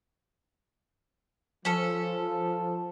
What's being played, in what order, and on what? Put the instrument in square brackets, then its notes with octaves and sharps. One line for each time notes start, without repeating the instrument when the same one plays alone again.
[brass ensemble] F3 [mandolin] C#4 A4